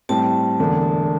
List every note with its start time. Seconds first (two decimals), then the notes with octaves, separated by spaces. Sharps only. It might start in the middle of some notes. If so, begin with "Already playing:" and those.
0.09 A2 G3 C4 A5
0.60 E1 E2 D3 A3 D4